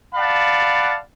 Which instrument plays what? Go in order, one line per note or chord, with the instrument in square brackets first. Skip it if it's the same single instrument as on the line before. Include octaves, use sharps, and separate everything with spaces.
[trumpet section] D5 F5 F#5 A5 B5